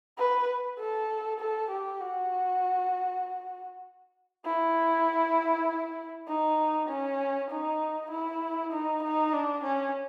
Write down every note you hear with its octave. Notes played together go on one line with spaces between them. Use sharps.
B4
A4
A4
G4
F#4
E4
D#4
C#4
D#4
E4
D#4
D#4
D4
C#4